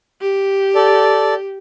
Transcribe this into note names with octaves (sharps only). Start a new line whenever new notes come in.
G4
A4 D5